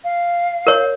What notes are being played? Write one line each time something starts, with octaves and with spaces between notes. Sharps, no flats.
F5
A#4 C#5